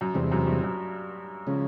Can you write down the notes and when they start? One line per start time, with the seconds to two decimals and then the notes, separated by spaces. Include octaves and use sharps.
0.01 F#2
0.14 E2 G2 C3 E3 G#3 C4
0.32 F#2
0.47 G2
0.64 F#2
1.47 C#3 F3 G#3 C#4